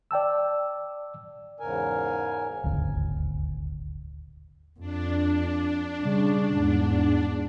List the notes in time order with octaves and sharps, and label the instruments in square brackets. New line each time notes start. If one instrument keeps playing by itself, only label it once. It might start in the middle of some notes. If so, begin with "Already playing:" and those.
[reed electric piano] D5 G5 A5 E6
[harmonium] E2 G#2 C#3 A#4 G#5
[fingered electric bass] D#1 G#1 D2 C#3
[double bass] F2 [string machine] D4
[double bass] C#3 G3
E2 G#2